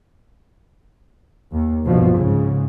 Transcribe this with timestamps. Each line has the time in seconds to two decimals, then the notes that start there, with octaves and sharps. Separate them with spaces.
1.53 D#2
1.85 C2 G2 B2 F3
2.14 G#2 C#3